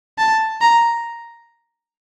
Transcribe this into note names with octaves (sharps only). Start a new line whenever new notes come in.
A5
A#5